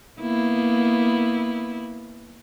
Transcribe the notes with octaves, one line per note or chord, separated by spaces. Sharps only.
A#3 B3 E4